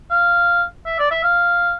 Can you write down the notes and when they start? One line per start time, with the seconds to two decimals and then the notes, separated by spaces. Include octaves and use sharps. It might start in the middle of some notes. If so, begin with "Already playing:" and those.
0.11 F5
0.86 E5
0.99 D5
1.11 E5
1.24 F5